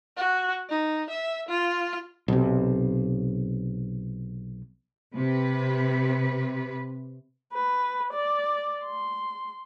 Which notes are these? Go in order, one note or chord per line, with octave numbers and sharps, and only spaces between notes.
F#4
D#4
E5
F4
B1 C3
C3 B4
B4
D5
C6